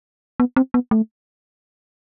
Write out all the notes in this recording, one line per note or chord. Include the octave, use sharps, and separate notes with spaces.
B3
C4
B3
A3